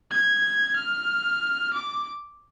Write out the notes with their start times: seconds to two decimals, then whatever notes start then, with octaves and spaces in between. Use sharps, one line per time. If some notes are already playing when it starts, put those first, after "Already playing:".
0.11 G#6
0.76 F6
1.73 D6